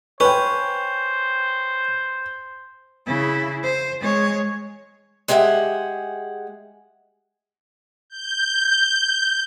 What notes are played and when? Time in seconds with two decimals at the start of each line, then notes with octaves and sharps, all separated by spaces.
0.20 C#4 B4 C5 G5
3.06 C#3 E4
3.63 C5
4.00 G#3 C#5
5.28 G#3 G4 G#4 E5 F#5
8.09 G6